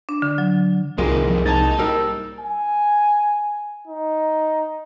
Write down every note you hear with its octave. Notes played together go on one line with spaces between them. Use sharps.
D4
D3
F#3
C2 D#3 G#3 A#3 F4
F2
D#4 A5 G#6 A6
G3 A#4 E6
G#5
D#4